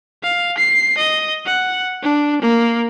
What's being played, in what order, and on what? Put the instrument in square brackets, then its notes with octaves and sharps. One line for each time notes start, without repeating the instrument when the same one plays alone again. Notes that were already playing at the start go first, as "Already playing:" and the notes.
[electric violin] F5
C7
D#5
F#5
D4
A#3